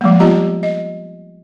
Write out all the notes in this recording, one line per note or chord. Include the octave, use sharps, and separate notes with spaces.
F3 G3 G#3 A#3
B3 F4 G4 D#5 A#5
D#5